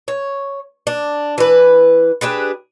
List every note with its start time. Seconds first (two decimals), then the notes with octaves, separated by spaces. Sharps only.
0.08 C#5
0.87 D4
1.38 E3 B4
2.21 D4 G4 G#4 B4